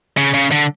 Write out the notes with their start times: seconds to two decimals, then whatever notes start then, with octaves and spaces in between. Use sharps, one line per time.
0.17 C#3
0.34 C#3
0.52 D3